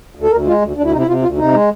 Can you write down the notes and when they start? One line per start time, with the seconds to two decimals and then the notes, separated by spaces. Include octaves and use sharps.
0.15 D2
0.23 A4
0.31 D2 A#4
0.47 G#3 F4
0.62 D2
0.77 D2 D4
0.84 E4
0.92 C3 D#4
1.00 E4
1.07 C3 F4
1.22 D2 F4
1.38 C3 D#4
1.53 G#3